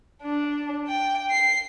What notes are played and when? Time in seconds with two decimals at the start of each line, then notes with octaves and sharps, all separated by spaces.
0.22 D4
0.88 G5
1.31 C7